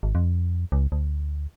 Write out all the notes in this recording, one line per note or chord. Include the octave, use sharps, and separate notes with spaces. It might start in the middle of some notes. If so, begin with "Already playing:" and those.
G#1
F2
C#2
D2